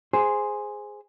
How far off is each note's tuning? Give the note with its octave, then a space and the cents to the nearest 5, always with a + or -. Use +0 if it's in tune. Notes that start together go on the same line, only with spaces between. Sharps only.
G#4 +0 C5 +0